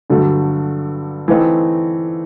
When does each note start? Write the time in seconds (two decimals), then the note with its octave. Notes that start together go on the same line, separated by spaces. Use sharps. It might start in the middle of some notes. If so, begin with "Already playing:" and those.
0.10 G2 D3 F#3 A3
1.28 E3 A3 C4 D#4